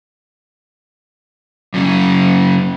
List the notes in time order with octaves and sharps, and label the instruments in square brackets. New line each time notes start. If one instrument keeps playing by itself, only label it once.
[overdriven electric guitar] F#2 C#3